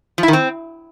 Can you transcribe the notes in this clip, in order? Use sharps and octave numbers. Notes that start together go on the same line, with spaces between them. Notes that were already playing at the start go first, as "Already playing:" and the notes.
F3
E4
D#3
C4